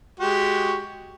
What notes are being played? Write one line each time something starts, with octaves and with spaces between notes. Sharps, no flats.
G#3 F#4 G4